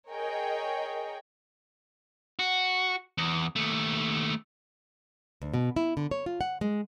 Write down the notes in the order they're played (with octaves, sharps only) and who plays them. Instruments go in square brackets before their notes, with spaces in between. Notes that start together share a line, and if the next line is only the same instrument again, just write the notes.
[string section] G#4 A#4 C#5 D#5 G5
[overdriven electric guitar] F#4
E2
D#2 A3
[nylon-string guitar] D2
B2
E4
D3
C#5
F4
F#5
G#3